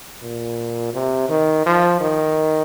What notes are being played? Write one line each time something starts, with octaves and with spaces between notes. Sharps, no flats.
A#2
C3
D#3
F3
D#3